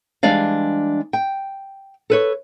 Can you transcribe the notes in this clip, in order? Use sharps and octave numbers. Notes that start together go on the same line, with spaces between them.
E3 G3 G#3 D4 D5 F5
G5
A4 B4 C#5